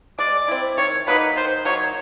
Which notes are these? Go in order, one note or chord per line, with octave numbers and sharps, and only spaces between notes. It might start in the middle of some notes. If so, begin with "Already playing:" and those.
G#3 D5
C4 E4
D#3 C#5
F#3 A#3 D#4 B4
D#3 C5
F#3 A#3 D#4 C#5